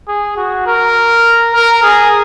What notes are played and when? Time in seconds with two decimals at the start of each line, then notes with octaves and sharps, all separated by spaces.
0.08 G#4
0.37 F#4
0.67 A#4
1.54 A#4
1.83 G#4